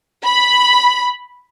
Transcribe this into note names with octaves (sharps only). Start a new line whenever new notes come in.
B5